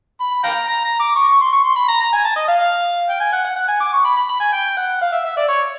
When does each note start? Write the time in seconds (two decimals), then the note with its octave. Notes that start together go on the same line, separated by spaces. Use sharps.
0.20 B5
0.44 F5 G5 A#5
0.68 A#5
0.84 A#5
1.00 D6
1.16 C#6
1.28 C#6
1.41 C6
1.53 C#6
1.64 C6
1.76 B5
1.88 A#5
2.00 A#5
2.13 G#5
2.25 A5
2.36 D#5
2.48 F5
3.09 G5
3.20 G#5
3.32 F#5
3.45 F#5
3.56 F#5
3.68 G#5
3.80 D6
3.93 C#6
4.05 B5
4.17 B5
4.29 B5
4.40 G#5
4.53 G5
4.77 F#5
5.01 F5
5.12 E5
5.25 E5
5.37 D5
5.48 C#5